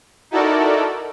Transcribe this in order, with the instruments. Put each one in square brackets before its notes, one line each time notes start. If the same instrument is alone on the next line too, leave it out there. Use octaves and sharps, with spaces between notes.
[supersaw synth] D#4 E4 F#4 A4 A#4 D5